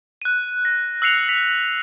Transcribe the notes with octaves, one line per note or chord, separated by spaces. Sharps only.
F#6 D#7
A#6
E6 F#6 C7 C#7 F7
B6 F7